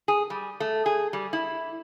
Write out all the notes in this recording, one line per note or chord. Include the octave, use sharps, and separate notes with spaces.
G#4
G3
A3
G#4
G3
E4